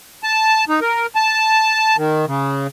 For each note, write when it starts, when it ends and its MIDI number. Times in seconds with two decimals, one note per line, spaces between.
0.23 0.65 81
0.69 0.80 63
0.81 1.06 70
1.15 1.97 81
1.97 2.26 51
2.27 2.67 49